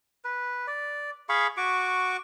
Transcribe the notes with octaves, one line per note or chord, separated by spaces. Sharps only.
B4
D5
G#4 F5 B5 C#6
F#4 C#6 D6